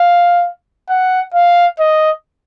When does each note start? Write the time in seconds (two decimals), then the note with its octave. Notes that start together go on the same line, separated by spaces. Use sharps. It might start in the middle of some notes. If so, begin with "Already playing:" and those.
Already playing: F5
0.89 F#5
1.34 F5
1.79 D#5